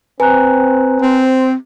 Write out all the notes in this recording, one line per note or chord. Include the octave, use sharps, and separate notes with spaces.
C4 B4 G#5 A#5 F#6
C4 C5